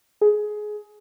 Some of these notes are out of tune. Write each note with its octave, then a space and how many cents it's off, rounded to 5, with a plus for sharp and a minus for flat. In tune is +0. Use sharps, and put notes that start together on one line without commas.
G#4 +15